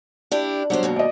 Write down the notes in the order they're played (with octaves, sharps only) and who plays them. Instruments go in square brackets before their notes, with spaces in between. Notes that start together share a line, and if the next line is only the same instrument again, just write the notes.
[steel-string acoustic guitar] D4 E4 G4
[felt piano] F#3 D4 [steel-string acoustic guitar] G3 B3 C5
[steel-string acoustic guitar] D#2 G#2 B2
[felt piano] D5 D#5